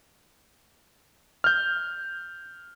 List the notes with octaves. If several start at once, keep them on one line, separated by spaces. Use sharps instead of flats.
F6 G6